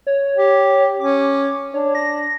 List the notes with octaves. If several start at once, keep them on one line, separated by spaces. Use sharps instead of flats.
C#5
G4
C#4 D6
D4 C#5
A#6